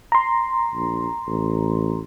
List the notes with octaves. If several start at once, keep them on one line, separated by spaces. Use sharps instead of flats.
A#5 C6
A#1
A1